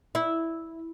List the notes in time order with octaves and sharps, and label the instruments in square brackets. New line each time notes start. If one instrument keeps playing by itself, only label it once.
[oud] E4